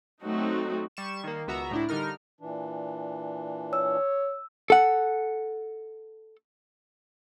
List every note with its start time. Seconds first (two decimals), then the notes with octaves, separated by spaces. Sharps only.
0.22 F#3 A3 C4 D#4 F#4
0.97 G3 C#6 E7
1.24 D#3 A#3
1.47 C#2 B3 F#4 E5 A#5
1.71 A2 D4 E4
1.89 D3 G3 D#4 A#4 F6
2.41 A#2 E3 D4
3.73 C#5 E6
4.70 A4 F#5